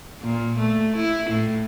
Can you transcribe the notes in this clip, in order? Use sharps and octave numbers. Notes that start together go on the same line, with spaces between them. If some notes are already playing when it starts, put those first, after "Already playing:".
A#2
A3
E4
A2